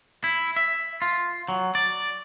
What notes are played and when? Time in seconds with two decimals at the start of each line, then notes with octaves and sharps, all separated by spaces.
0.24 E4
0.56 E5
1.02 F4
1.48 F#3
1.75 D5